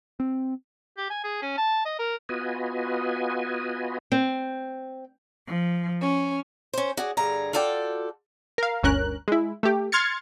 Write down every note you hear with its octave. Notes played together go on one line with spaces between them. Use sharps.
C4
G4
G#5
G#4
C#4
A5
D#5
A#4
B3 F4 F#4 B4 D#5 G#5
C4
F3
C#4
C#4 C5
F#4 G#4 D5
G2 D3 G#4 A#5
F4 F#4 A4 D5 G5
A#4 F5
G1 D2 C#4 A#4 F#6
G#3 E4
A3 G4
C6 F6 G#6 A6 C#7